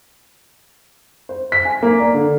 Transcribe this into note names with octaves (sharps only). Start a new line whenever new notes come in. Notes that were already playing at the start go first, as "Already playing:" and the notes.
C5
B6
G#5
A#3
D5
D3